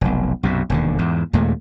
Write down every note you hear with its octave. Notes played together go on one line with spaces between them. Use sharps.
F1 B1
B1 F#2 C3
E1 D#2 D3
E2 G#2
D#2 A#2 G#3 A3